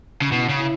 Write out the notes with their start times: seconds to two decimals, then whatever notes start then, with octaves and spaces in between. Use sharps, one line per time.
0.22 C#3
0.31 B2 E4
0.49 C#3
0.58 E4